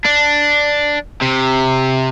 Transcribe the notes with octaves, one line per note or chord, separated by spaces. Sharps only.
D4
C3